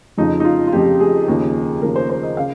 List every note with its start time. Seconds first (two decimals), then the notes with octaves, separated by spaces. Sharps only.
0.17 F1 F2 C#3 F3 D#4
0.40 D#4
0.45 F4
0.67 F4
0.72 F1 F2 C#3 F3 G4
1.00 G#4
1.28 D#2 C#3 F3
1.81 D#2 C#3 F3 A#4
1.96 C5
2.09 C5
2.23 D#5
2.37 C#3 F5